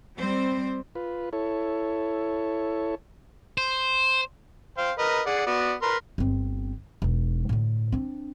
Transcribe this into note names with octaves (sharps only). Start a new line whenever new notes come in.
G3 C4 C5
F4 B4
E4 A4 C#5
C5
C5 F5 G5
A#4 B4 D#5
G#4 D5 F#5
B3 F#4 D5
A#4 B4 C6
G1 C4
E1 D#4
A2 D3
C4 D4